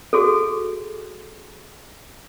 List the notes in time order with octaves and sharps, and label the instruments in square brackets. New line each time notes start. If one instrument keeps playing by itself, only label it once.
[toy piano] F#4 G#4 A4